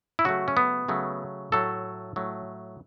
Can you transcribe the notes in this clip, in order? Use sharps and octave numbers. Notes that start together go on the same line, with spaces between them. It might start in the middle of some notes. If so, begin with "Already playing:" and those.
E4
C#3 F#3 A3 F#4
C#4
B3
C#3 F#3 A3
A2 F#3 A3 A4
A2 F#3 A3